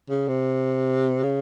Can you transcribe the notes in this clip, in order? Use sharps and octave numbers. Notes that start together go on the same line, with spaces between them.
C#3
C3
C#3